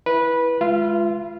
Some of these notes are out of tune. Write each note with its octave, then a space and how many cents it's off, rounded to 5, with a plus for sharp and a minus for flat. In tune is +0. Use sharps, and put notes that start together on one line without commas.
E4 +0 B4 -15
G#3 +10 F4 -15 E5 +35